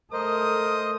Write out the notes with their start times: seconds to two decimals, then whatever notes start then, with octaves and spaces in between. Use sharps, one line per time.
0.13 A3 A#4 C5 D#5 D#6